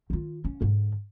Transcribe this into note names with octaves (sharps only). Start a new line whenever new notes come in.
D#3 F4
C#4
G#2 D3